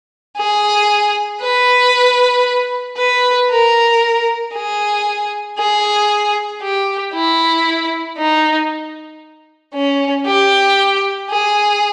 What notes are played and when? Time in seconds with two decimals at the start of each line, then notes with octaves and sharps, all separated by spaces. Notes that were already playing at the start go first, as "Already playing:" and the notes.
0.37 G#4
1.42 B4
2.97 B4
3.51 A#4
4.54 G#4
5.59 G#4
6.62 G4
7.14 E4
8.18 D#4
9.74 C#4
10.26 G4
11.31 G#4